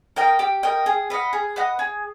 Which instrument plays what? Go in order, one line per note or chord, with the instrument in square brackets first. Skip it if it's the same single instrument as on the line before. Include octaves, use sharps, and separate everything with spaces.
[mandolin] A#4 D#5 G5
G4
A#4 D#5 G5
G#4
B4 D#5 F#5
G#4
B4 D#5 F#5
G#4